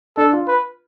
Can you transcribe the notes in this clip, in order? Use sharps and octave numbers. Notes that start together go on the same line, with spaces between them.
D4 A4
F4
B4